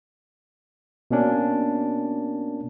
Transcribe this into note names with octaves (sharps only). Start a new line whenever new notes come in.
B2 A#3 C#4 D4